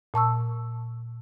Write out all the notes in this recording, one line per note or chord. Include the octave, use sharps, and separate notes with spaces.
A#2 A5 C#6 E6